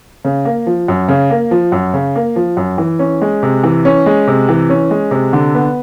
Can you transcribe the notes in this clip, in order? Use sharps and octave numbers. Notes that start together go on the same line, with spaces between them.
C#3
A#3
F3
F#2
C#3
A#3
F3
F#2
C#3
A#3
F3
F#2
E3
C#4
G#3
C3
E3
C#4
G#3
C3
E3
C#4
G#3
C3
D3
B3